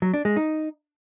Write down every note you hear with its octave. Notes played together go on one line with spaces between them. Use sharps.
F#3
D4
G#3
D#4